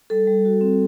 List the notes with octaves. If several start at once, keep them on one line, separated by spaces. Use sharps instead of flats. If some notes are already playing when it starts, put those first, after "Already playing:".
G3 A4
G3
F#4
C4